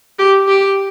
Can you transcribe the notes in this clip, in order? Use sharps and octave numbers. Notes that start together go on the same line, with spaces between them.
G4
G4